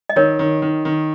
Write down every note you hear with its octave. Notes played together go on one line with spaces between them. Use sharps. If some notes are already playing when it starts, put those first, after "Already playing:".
D#5
D#3 A#4 C#5
D#3
D#3
D#3